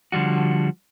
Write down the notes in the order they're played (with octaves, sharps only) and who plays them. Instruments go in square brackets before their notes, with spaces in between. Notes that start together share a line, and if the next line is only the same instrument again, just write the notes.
[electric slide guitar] D3 F3 G3 F#4